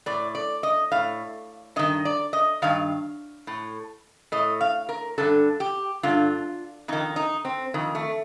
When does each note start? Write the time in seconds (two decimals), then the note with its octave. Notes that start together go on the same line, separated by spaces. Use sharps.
0.06 A2 D5
0.35 D5
0.63 D#5
0.92 A2 F5
1.76 G2 D#3 D#5
2.05 D5
2.33 D#5
2.62 G2 D#3 F5
3.47 A2
4.32 A2 D#5
4.61 F5
4.89 A#4
5.18 G2 D3 A4
5.60 G4
6.03 G2 D3 F4
6.88 F2 D#3 D#4
7.16 D#4
7.45 C4
7.74 F2 D#3
7.95 A3